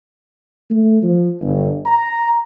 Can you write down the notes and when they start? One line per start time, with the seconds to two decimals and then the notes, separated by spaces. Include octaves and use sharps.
0.70 A3
1.03 F3
1.41 G1
1.86 A#5